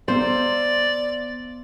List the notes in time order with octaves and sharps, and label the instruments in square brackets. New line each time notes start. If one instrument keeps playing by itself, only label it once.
[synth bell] B3 C6 [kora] C5 [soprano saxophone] D5